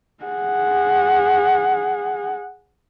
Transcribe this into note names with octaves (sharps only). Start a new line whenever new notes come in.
G#4 F#5